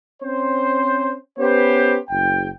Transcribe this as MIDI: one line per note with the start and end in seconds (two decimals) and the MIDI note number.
0.22 1.15 60
0.22 1.15 61
0.22 1.15 72
1.39 1.97 59
1.39 1.97 61
1.39 1.97 67
1.39 1.97 71
1.39 1.97 72
2.10 2.49 30
2.10 2.49 79